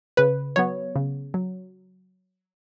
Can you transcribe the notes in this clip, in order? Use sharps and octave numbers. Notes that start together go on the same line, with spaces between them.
C#3 B4
F#3 B3 C#5
C#3
F#3